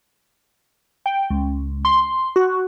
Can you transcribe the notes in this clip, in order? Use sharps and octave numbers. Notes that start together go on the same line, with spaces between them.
G5
C#2
C6
F#4